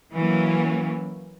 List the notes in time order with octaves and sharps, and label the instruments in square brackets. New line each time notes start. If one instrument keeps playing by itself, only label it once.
[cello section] E3 F#3 A#3 C#4